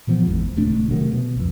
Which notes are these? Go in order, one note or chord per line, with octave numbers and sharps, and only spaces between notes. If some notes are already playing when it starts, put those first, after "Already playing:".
A#2 E3 F3 B3
G#1 E2 G#2
D#1 C#3 A3 D4
C3 D#3 F#3 A3
B2
C2 F2